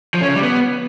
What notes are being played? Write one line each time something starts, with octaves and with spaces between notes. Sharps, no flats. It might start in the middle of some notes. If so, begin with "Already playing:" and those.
F3
C#4
C#3
G3
B3